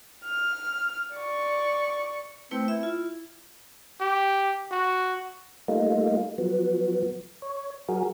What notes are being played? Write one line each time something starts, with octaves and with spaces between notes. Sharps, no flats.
F6
D5 C#6
A3 C4 E4 B4
E4 E5
F4
G4
F#4
G3 A3 A#3 D#4 F4
F3 F#3 B3
C#5
F#3 F#4 G#4 A#4